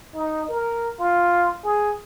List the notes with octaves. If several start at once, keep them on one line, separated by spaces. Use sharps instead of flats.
D#4
A#4
F4
G#4